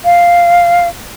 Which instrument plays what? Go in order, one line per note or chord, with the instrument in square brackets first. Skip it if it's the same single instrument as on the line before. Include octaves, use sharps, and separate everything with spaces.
[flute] F5